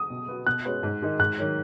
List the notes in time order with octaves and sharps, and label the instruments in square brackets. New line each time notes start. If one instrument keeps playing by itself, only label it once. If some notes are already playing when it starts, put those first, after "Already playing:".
Already playing: [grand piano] D#6
[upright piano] B2
B3 F#4
[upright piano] B2 [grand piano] F#6
[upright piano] G#3 C#4 F#4 B4
G#2
D#3 G#3 D#4
[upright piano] G#2 [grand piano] F#6
[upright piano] D#3 F#3